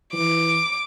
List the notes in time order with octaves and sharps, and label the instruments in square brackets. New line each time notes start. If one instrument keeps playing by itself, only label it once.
[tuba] E3 [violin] D6